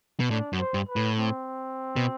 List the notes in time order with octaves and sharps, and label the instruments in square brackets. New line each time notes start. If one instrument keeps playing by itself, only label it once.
[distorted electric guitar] B2
[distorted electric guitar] A2 [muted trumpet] D4
[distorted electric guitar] F#2
[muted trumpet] C5
[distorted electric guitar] G2
[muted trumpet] B4
[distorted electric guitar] A2
[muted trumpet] C4
[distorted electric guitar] B2